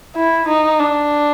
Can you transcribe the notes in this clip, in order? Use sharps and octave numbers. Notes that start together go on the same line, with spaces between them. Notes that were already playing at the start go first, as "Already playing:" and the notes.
E4
D#4
D4